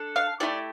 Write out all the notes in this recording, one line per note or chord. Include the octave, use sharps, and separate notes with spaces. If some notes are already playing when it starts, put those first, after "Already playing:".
Already playing: D4 A4
F5
A3 C4 E4 G4 D5